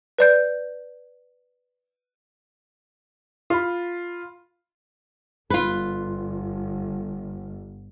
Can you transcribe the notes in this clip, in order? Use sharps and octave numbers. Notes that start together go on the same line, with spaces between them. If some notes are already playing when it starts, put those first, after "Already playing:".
B4 D5 G6
F4 B5
G1 F4 B4